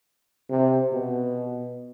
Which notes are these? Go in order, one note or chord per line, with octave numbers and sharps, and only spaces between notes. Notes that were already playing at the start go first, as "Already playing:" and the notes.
C3
B2